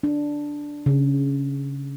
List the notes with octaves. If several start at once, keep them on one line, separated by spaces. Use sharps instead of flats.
D4
C#3